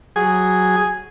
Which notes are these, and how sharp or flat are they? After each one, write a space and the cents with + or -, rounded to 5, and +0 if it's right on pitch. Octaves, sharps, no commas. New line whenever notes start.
F#3 +0 G#4 +0